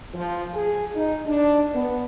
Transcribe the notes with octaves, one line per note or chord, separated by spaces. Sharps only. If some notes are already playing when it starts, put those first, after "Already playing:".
F3
G#4
D#4
D4
B3